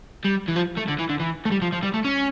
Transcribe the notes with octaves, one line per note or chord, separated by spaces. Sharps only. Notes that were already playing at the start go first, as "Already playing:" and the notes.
G3
E3
F3
A3
D3
E3
D3
E3
A3
G3
F3
F3
G3
A3
C#4